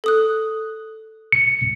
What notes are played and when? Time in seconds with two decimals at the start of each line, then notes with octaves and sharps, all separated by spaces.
0.04 A4 D#6 F#6
1.32 C#7